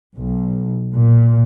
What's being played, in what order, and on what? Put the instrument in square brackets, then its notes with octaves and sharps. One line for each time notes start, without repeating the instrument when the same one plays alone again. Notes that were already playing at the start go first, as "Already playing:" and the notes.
[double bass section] B1
A#2